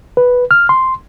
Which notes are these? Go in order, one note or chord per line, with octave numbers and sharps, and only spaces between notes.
B4
F6
C6